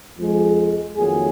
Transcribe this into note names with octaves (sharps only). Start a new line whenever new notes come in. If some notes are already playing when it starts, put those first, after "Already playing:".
F2 F3 G#3
F2 D#3 F#3 A#3 G#4